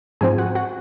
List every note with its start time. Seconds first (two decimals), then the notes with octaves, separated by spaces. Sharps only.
0.21 G#2 F3 C4 G#4 G#5
0.38 F#4 F#5
0.55 F#4 F#5